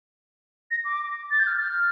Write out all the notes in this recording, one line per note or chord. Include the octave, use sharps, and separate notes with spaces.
A#6
D6
A6
G6
F6
F6